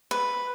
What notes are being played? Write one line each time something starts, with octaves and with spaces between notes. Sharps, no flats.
B4